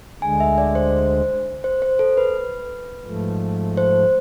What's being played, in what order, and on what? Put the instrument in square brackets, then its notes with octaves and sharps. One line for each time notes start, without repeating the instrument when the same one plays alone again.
[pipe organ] D2 D3 G#3 [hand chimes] G#5
[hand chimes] E5
D5
C5
C5
C5
A4
B4
[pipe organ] G#2 F3 A3
[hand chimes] C5